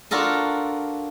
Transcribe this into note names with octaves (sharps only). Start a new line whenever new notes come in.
D4 F4 F#4 A4 A#4